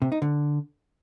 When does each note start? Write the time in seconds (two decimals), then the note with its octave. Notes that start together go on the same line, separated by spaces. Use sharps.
0.02 C3
0.12 D#4
0.22 D3